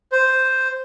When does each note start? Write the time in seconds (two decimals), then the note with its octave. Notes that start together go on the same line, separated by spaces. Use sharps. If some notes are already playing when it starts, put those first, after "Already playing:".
0.12 C5